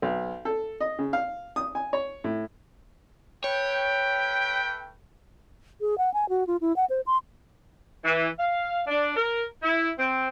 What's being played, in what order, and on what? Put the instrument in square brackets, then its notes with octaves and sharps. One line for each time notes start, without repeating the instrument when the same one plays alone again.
[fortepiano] B1
A4
D#5
C#3
F5
D#6
G#5
C#5
A2
[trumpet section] A3 B4 G5 [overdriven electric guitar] C#5
[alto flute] G#4
F#5
G#5
F#4
F4
E4
F#5
C5
C6
[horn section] E3
F5
D4
A#4
E4
C4